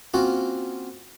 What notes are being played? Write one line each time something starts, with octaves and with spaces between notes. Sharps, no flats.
A#3 C4 C#4 F4 F#4